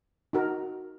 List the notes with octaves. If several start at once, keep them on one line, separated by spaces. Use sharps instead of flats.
D#4 F#4 A#4